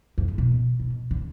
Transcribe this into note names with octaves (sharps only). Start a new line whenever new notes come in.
F2
F#2
B2
B2
D3